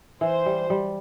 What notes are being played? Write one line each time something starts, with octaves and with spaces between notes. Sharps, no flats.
E3 C5
G3
G3